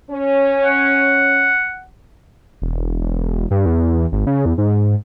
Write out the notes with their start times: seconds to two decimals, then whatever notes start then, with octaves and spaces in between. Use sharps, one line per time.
0.10 C#4
0.65 F#5
2.62 E1
3.01 E1
3.51 G2
3.66 E2
4.12 G#1
4.27 C#3
4.46 E2
4.58 G#2